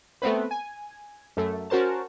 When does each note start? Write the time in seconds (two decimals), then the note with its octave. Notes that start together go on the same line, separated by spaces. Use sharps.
0.22 A3 B3 C4 B4
0.51 G#5
1.37 F#2 A3
1.70 C#4 F#4 A#4 C5 A5